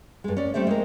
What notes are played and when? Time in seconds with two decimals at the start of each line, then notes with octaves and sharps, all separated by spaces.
0.24 G2 G#3
0.37 C#4 D5
0.54 G3 A3 C4 C5 E5
0.67 G#3 C4 A#4